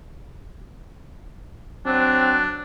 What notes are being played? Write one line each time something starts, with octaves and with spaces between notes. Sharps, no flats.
F#3 C4 D4